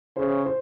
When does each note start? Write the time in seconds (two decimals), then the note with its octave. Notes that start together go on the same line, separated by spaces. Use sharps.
0.17 C#3 C5
0.46 C5